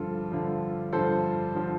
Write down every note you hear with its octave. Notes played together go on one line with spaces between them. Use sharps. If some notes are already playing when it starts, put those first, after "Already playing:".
Already playing: G2 D3 F3 F4 A4
G2 D3 F3
G2 D3 F3 A4 C5
D3 F3